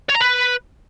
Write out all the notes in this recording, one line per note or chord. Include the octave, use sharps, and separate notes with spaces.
C#5
A#5
B4